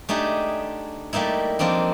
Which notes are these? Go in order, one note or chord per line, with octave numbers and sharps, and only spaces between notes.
A3 D4 D#4 G4 G#4
G3 A3 A#3 D#4 E4
F3 A#3 C4 D4 D#4